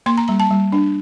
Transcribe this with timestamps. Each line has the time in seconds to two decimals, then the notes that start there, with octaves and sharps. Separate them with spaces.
0.06 A#3 C6
0.18 A#5
0.28 G3 A#5
0.40 A5
0.51 G3
0.72 D4